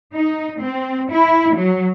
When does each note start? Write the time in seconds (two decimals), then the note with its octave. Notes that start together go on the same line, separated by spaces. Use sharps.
0.13 D#4
0.61 C4
1.09 E4
1.54 F#3